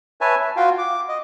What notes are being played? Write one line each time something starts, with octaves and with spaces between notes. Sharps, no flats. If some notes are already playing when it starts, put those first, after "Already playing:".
B4 C#5 E5 G#5 A5
E5
F4 F#4 F5 G5
D6
D#5